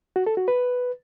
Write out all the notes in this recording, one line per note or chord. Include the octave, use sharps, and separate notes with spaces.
F#4
A4
F#4
B4